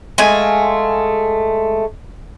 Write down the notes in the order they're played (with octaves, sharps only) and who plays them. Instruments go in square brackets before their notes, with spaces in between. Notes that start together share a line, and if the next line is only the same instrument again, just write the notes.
[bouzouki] G#3 A3 F5 G#5